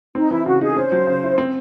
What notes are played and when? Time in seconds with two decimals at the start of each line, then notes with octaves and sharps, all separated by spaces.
0.15 C4 D#4
0.30 E3 E4
0.45 C#3 F#4
0.61 D#4 G#4
0.70 A4
0.77 C#4 C5
0.92 F#3
1.07 C#3
1.23 E4
1.38 C4